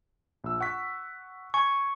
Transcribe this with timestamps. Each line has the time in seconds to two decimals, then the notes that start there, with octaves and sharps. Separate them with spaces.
0.44 A#1 E6
0.61 F#5 C#6 B6
1.54 G#5 C#6